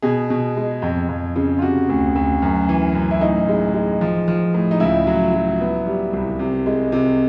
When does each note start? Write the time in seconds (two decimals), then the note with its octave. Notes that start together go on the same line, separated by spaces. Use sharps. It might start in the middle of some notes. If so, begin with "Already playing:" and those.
0.02 B2 G#4
0.30 B2
0.57 G#3
0.82 F2
1.09 F2
1.36 C#3
1.59 F4
1.62 C3 F#4
1.89 D2
2.15 D2
2.42 F#2
2.69 E3
2.95 F#2
3.11 E4
3.21 A2 D#4
3.48 G#3
3.74 G#3
4.01 F3
4.28 F3
4.54 A2
4.71 D#4
4.80 C#2 E4
5.07 F#3
5.34 F#3
5.61 B3
5.86 G3
6.13 C2
6.39 C3
6.66 G#3
6.92 C3